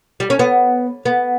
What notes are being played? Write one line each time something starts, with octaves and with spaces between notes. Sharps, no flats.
G3
C#4
B3
B3